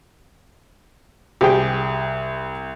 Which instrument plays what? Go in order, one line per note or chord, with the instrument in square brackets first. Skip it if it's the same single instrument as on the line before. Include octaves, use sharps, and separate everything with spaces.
[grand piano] C2 [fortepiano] G4 G#4 G5